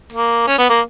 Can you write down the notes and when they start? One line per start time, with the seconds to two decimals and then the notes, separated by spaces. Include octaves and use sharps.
0.12 A#3
0.48 C#4
0.58 B3
0.69 A#3